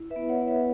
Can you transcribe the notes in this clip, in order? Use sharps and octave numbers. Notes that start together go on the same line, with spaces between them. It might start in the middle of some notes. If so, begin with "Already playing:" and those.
Already playing: E4
B4 E5
B3
C#5 F#5
B3
B4 E5